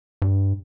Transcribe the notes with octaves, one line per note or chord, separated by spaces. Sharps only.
G2